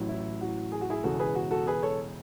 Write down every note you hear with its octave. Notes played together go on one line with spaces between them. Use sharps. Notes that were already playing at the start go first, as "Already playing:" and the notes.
Already playing: A1 A2 F#3
E4
F#4
G#4
F#4
E4 G#4
E1 E2 C#3 F#4 A4
G#4 B4
F#4
F#4 A4
G#4 B4
A4 C#5